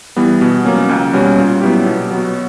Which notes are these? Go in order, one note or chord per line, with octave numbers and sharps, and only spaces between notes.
E3 G3 B3
B2
F#3 A#3 C#4
C#2
B2 G3 C#4
A#2
F#3 B3 E4 G4
B2
F#3 B3 F#4